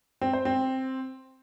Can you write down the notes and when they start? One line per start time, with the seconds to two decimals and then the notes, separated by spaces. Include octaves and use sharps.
0.21 C4
0.33 C5
0.45 C4